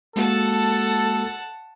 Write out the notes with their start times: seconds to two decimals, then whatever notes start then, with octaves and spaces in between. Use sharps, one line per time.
0.16 G#3 A#3 F#4 A4 F#5 A5